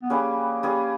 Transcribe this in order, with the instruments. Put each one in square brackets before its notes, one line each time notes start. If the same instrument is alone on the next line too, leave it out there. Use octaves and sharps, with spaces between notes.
[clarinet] B3
[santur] G3 C#4 G#4 B4 [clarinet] A#3
[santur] G3 C#4 G#4 B4